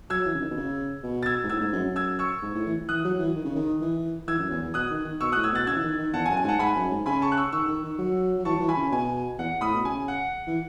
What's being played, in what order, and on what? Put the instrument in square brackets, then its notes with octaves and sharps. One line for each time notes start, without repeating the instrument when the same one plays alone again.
[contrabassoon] F#3 [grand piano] E6 G#6
[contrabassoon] E3
C#3
D#3
B2
C#3
B2
[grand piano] A6
E6 G#6
[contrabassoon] G#2
[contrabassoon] A2 [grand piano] E6 G#6
[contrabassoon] G#2
F#2
F#2
[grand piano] E6 G#6
C#6 E6
[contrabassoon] G#2
A2
E3
[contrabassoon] E3 [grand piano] D#6 F#6
[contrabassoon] F#3
F#3
E3
D#3
C#3
D#3
E3
[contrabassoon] E3 [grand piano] E6 G#6
[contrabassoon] F#2
E2
E2
[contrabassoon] B2 [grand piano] D#6 F#6
[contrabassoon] D#3
D#3
[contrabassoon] B2 [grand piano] C#6 E6
[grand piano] D#6 F#6
[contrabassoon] A2
[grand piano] E6 G#6
[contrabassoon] B2 [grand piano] F#6 A6
[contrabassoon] C#3 [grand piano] E6 G#6
[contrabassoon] E3
D#3
D#3
[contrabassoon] E2 [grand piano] F#5 A5
[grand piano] G#5
[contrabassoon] F#2
[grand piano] G#5
[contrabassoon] G#2 [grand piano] F#5 A5
[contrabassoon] G#2 [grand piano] G#5 B5
[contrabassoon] F#2
G#2
[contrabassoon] C#3 [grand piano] G#5 B5
[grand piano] A5 C#6
F#6
C#6 E6
[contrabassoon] D#3 [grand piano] C#6 E6
[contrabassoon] D#3
D#3
F#3
F#3
[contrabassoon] E3 [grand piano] A5 C#6
[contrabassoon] F#3
E3
[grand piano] G#5 B5
[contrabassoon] C#3
[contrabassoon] B2 [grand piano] G#5
[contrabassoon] E2 [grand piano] F#5
[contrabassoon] A2 [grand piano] B5 D#6
[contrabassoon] B2
[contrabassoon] C#3 [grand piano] G#5
[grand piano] F#5
[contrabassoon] E3